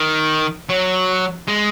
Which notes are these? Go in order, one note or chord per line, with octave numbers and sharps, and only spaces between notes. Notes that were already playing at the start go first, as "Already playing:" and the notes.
Already playing: D#3
F#3
G#3